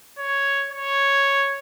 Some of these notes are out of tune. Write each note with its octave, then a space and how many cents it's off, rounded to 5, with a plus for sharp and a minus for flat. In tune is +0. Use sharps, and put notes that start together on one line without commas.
C#5 +0
C#5 +0